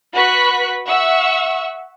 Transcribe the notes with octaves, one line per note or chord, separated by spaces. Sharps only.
F#4 B4 B5 C#6 F#6 B6
E5 F#5 C#6 E6